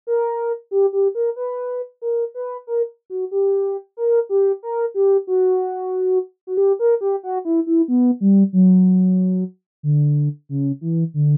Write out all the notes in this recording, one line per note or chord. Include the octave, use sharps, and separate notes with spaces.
A#4
G4
G4
A#4
B4
A#4
B4
A#4
F#4
G4
A#4
G4
A#4
G4
F#4
F#4
G4
A#4
G4
F#4
E4
E4
B3
G3
F#3
D3
C#3
E3
D3